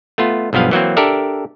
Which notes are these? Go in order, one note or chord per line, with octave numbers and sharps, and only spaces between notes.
A3 B3 F4
B1 G2 F3 B3 F5
E3 F#3 A#3 C4
D4 G4 A4 A#4 D5 E5